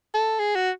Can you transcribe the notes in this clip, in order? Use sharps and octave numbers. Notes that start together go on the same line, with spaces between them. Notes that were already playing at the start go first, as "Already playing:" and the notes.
A4
G#4
F#4